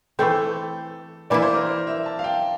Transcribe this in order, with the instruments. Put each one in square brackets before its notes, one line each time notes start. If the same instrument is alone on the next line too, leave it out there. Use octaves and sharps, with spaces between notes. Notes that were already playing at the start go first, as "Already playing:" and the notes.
[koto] E3 A3 C4 [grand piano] A4
[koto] E3 A#3 E4 [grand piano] D5
[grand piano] C5
A#4
C5
E5
A5
F5
G5